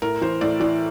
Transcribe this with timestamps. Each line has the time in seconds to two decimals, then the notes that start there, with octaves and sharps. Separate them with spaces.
0.02 A2 A#4
0.21 E3 C5
0.41 A2 D5
0.60 E3 D5